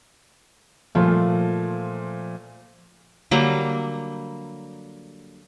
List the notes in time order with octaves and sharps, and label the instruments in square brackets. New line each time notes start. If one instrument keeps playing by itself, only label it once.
[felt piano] A#2 A3 [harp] F3
[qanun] D3 F#3 G3 A#3